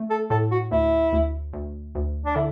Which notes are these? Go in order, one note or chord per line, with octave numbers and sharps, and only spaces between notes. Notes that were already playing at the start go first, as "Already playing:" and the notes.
Already playing: A3
A4
A2 A4
F#4
D2 E4
D2
D2
D2
D4
D3 E4